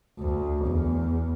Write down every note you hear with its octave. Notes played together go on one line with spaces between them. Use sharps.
D2
E2